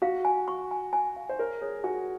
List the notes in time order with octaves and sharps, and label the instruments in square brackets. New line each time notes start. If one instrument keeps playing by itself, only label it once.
[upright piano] F#4 [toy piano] F5
[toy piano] G#5
C#6
G#5
G#5
F5
[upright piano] C5
[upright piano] A#4 [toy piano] C#5
[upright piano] G#4 [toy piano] C#5
[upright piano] F#4 [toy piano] G#5